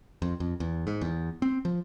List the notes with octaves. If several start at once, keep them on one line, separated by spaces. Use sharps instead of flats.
F2
F2
E2
G#2
E2
C4
F3